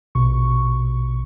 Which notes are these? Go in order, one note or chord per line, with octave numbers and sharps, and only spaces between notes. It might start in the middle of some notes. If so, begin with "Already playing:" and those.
A#1 B2 C#6